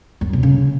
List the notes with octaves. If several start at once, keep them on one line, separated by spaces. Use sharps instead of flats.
F#2
B2
C#3